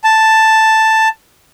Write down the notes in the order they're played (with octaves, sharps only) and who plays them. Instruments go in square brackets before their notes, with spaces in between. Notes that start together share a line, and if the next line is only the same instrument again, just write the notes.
[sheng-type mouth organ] A5